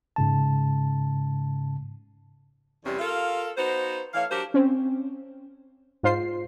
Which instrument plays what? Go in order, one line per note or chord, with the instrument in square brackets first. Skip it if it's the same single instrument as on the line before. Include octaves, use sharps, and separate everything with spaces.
[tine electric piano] G#2 C#3 A5
[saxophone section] E2 C3 G3 C#4
F4 A4 A#4 F5
B3 D#4 F#4 C5
E3 A3 C#5 F5
F#3 D4 F#4 G4 A#4 C5
[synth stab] C4 C#4
G#2 F4 C5 C7